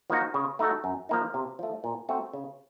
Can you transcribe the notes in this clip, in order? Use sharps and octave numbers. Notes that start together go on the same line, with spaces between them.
F3 A#3 D#4 F#4
C#3
A3 D#4 F#4 A4
F#2
F3 A#3 D#4
C3
F3 A3
A#2
A3 C4 F#4
C#3